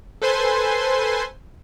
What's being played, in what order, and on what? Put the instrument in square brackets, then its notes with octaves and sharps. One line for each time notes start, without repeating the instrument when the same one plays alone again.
[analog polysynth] A4 B4 C5 G#5 C6